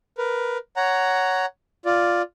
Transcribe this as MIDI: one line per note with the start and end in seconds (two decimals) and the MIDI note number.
0.18 0.58 70
0.18 0.58 71
0.76 1.46 73
0.76 1.46 78
0.76 1.46 82
1.85 2.22 65
1.85 2.22 74